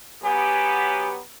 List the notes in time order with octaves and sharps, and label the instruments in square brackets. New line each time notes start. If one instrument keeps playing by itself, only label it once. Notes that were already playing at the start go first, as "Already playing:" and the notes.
[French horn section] F#3 B3 G4 [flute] G#5